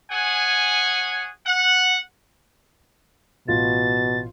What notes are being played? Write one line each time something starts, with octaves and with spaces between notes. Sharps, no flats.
G#4 C#5 F#5 G#5
F#5
A1 B2 F4 A6